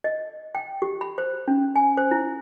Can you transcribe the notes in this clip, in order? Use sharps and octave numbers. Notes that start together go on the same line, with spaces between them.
D#5
G5
G4
B5
C5
C#4
G#5
C5
E4